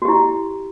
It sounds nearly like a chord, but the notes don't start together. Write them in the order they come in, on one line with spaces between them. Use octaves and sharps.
F#4 G4 E4